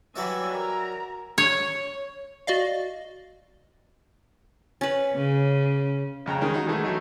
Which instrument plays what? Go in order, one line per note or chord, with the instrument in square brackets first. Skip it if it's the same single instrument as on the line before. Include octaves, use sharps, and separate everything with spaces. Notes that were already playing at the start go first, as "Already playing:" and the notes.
[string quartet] E3 G3 [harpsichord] F#3 C#5 D5 [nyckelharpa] E5 G#5
[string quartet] A#4 A#5
[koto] C#5
[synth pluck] F#4 D5 D#5 F5
[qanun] C#4 B4
[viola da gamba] C#3
[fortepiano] F2 C#3 G5 A#5
D#3 G#3 C#4
D#4 F#4
D#3 E3 G#3 A3 D#4 G#4
E3 F#3 A3 D#4